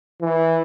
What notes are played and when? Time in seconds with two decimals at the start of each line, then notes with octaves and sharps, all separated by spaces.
0.21 E3